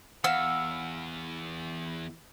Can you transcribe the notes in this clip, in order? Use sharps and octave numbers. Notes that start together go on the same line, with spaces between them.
E2 F5 F#5 E6